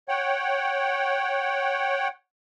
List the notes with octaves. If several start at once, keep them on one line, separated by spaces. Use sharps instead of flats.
C#5 F#5 G5